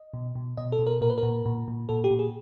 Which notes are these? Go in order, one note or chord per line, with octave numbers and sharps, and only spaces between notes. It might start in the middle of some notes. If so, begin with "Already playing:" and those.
Already playing: D#5
B2
B2
B2 D#5
A4
B2
A#4
A#2 A#4
B4
A#4
A#2
A#2
A#2
A#2 A4
G4
A#2
G#4